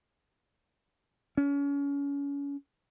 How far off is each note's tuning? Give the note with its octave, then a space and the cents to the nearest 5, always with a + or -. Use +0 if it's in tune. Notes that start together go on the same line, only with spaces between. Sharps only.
C#4 +30